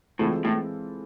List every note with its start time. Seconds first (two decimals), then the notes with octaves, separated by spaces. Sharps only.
0.19 A2 E3 G#3 C4 F4 A4
0.45 A2